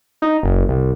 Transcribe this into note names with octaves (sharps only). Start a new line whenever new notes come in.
D#4
F#1
C2